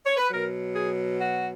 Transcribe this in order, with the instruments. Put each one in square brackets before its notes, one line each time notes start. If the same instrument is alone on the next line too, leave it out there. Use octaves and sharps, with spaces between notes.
[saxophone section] C#5
B4
B2 F#3 A#4
G#4
F#4